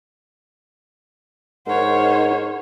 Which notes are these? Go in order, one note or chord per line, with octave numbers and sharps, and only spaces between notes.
G#2 D#4 A#4 C5 C#5 F#5